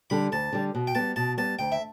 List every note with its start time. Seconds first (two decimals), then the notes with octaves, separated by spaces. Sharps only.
0.10 D3 G3 B5
0.32 D2 A5
0.53 D3 G3
0.75 B2
0.87 G5
0.95 G3 B3 A5
1.16 B2 A5
1.37 G3 B3 A5
1.59 D2 G5
1.72 E5